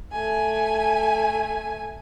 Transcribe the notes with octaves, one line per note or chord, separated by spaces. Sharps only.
A3 G#5